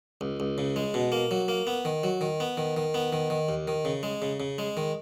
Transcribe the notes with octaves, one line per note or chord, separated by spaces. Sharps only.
C#2
C#2
C#3
G#3
B2
A#3
F#3
A#3
B3
D#3
F#3
D#3
B3
D#3
D#3
B3
D#3
D#3
D#2
D#3
C#3
G#3
C#3
C#3
G#3
D#3